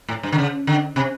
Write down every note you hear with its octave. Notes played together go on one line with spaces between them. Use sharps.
A2
G2
D3
C#3
D3
C3